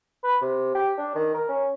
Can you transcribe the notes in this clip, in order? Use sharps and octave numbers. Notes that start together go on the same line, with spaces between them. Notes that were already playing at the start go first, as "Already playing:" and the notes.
B4
C3
G4
D4
D#3
A#4
C#4